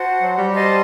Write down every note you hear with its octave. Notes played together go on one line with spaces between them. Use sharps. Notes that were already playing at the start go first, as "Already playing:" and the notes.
Already playing: F#4 C5 F#5 A5
F#3
G3
C5 D#5 A5 C6